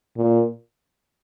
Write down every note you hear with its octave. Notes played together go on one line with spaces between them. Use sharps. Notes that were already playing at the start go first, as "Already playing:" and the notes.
A#2